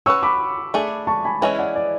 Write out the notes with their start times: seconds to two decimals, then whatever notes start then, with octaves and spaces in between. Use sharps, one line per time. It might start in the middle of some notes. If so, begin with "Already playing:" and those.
0.06 C#4 F#4 B4 C#6 E6
0.23 B5 D6
0.74 A3 D4 G#4
1.07 A5 C#6
1.25 G#5 B5
1.41 E3 G#3 C#4 E4 E5 G#5
1.58 D5 F#5
1.76 D5